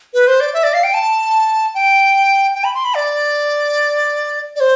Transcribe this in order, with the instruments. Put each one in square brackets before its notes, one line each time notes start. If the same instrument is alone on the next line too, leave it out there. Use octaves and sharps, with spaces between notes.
[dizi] B4
C5
D5
E5
D5
F5
G5
A5
G5
G5
B5
C6
B5
D5
D5
C5